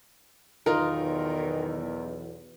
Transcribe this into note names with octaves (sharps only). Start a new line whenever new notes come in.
B1 E2 D#3 D#4 F4 A#4